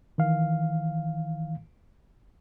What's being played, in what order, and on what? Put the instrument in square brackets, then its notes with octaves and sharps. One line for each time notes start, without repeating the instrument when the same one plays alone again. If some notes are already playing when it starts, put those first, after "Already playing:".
[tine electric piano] D#3 E3 F5